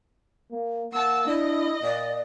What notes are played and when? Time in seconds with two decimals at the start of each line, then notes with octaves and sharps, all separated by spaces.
0.51 A#3
0.93 A#3 F#5 A5 E6
1.27 D4 E4 D#5
1.82 A#2 D5